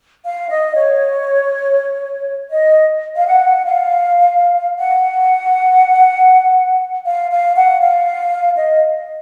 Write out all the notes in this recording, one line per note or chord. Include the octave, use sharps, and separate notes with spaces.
F5
D#5
C#5
D#5
F5
F#5
F5
F#5
F5
F5
F#5
F5
D#5